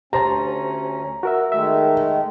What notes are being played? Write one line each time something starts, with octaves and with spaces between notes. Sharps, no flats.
D2 C#4 G4 C5 A5 A#5
F#4 A#4 E5
D#3 G#3 A3 E5